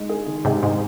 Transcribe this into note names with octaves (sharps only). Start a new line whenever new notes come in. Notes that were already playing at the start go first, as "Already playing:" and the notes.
Already playing: G#3 D#4
G#4
D#3
G#2 C3 G#3
G#2 D#4